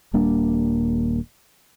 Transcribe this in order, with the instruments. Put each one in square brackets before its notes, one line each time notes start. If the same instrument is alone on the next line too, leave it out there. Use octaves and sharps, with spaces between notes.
[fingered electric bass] D#1 G3 A#3 D4